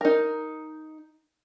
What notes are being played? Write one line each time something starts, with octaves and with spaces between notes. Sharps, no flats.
D#4 A#4